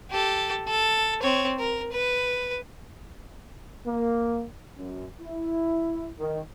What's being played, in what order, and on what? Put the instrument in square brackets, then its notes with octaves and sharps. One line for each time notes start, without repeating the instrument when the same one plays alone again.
[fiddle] G4 A4
A4
C4 C#5
A#4
B4
[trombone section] A#3
F#2
E4
D#3